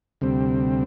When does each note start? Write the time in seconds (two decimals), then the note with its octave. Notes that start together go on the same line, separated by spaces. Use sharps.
0.21 D2 C3 G3 C4